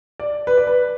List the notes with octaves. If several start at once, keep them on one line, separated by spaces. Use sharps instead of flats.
D5
B4
D5
B4